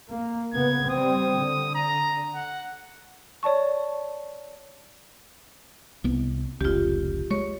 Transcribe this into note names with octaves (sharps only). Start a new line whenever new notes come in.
A#3
C#3 B3 G#6
G3 C4 D#6
D3
A#5
F#5
C#5 D5 A5 C#6
C2 B3
F1 C#2 F4 G4
G#3 C#5 C#6